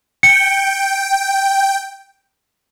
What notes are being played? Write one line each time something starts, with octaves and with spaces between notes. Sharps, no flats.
G5 C#7